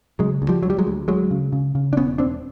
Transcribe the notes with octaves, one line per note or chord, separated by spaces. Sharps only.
C#3 F#3 G#3
D2
F3 G3
D2 F#3
G3
F#3 G#3
D2
D2 F#3 G#3
C#3
C#3
C#3
D4
E1 B3 C#4
E1 C4 D4